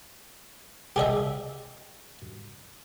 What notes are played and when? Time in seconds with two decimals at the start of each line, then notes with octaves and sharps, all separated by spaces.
0.96 G4 G#4 D#5 E5